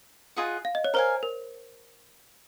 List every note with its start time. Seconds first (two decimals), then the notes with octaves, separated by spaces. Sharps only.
0.36 F4 G#4 D#5 F#5
0.65 F5
0.75 D#5
0.84 C#5
0.94 A#4 C5 F5 G#5
1.23 A#4